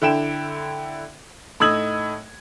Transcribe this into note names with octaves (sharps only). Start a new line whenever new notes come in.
D3 E4 G5 E7
A2 D#4 D#6 E6 G#6 F#7